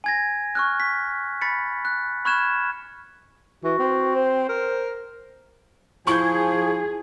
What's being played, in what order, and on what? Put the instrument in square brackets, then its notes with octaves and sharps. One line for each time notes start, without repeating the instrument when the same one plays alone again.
[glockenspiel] G#5 G#6 A#6
C#6 F6 F#6
B6
B5 A6 B6 C#7
F#6
B5 C#6 F6 F#6 G#6 E7
[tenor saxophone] E3 [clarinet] F#4
[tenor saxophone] C4
[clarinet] C5
[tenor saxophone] A#4
[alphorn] F3 [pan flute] E4 [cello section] G#4 [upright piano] C#6 G6